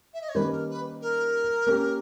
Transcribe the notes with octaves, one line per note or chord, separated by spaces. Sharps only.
E5
D#5
C#5
D#3 G3 A#3 C#4 B4
A#4
B4
A#4
A#3 C#4 G4